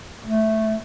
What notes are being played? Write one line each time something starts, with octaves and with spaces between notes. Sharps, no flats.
A3